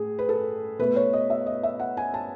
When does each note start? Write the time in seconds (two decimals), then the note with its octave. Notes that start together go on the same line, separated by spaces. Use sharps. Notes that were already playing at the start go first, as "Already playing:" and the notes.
Already playing: A2 G#4
0.19 B4
0.29 A4
0.79 B2 A3 B4
0.96 C#5
1.13 D#5
1.30 E5
1.46 D#5
1.63 E5
1.79 F#5
1.97 G#5
2.14 A5